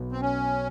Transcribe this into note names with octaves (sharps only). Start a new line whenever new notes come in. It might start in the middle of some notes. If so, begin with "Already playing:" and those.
Already playing: B1 B2 B3
C4
C#4